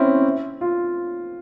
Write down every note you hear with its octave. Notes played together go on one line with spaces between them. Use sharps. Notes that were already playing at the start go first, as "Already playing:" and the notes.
Already playing: C4 C#4 E4
F4